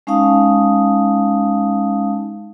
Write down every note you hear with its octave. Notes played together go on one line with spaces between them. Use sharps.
G#3 C#4 D#4 F5 A5 D#6